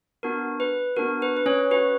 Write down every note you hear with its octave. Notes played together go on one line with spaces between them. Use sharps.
B3 D4 F#4 A#4
B4
B3 D4 F#4 A#4
B4
B4
C#4 C#5
C#4 F#4 B4